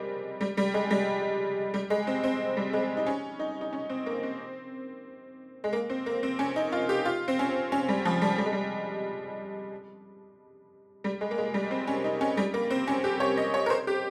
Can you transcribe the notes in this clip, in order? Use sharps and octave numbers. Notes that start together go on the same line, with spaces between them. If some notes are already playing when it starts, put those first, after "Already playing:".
Already playing: G3 G#3 A#3 C4
G3
G3
G#3
G3
G3
G#3
C4
C4
G3
G#3
D#4
C#4
D#4
D#4
C#4
C4
A#3
C4
G#3
A#3
C4
A#3
C4
C#4
D#4
F4
G4
F4
C4
C#4
C#4
G3
F3
G3
G3
G#3
G3
G3
G#3
A#3
G#3
G3
C4
C#4
D#4
C#4
G3
A#3
C4
C#4
G4
C#5
D#5
C#5
A#4
C5
G4